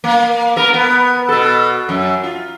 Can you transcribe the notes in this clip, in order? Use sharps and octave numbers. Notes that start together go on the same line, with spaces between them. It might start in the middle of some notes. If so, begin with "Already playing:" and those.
A#3
B3 A#4
B3
B2 A4
F#2
F4